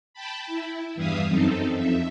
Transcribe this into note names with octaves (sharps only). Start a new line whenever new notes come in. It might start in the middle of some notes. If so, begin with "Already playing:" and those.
G5 A5 B5
E4
E2 G2 E3 E5 F5 D#6
F#2 C4 D#4 A4
F2 E5